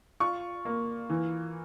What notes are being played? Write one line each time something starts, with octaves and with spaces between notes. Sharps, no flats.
F4 C#6
A#3
E3